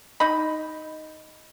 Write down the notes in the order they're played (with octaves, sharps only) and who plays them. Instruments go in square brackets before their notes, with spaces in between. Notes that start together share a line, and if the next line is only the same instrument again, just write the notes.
[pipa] D#4 D#5 B5